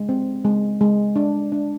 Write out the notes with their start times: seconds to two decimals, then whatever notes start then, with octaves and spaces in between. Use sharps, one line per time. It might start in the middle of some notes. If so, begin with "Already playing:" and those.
Already playing: G#3
0.09 C4
0.45 G#3
0.81 G#3
1.16 D4
1.52 D4